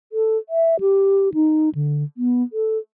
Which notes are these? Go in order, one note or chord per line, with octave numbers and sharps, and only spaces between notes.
A4
E5
G4
D#4
D3
B3
A4